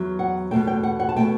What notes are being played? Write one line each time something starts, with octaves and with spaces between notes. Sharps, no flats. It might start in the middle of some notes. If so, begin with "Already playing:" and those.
Already playing: E2 F#3
F#5
E2 B2 A3 G5
G5
F#5
F#5
A5
B2 A3 G5